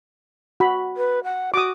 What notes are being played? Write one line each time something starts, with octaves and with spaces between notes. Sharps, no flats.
F#4 B5
B4
F#5
F#4 D6 D#6